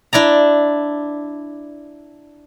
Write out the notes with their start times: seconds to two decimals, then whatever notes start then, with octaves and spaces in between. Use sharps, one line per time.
0.13 D4 E4 D5 A#5